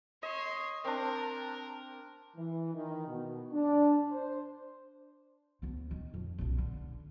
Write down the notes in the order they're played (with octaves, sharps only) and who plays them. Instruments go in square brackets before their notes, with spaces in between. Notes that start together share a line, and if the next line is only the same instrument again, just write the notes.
[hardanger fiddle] C#5 C6 [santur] D#5
[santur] C4 D4 [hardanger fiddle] A#4
[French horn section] E3
D#3
B2
D4
C5
[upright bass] D2 B3
D#3
F2
B1 C#3
D3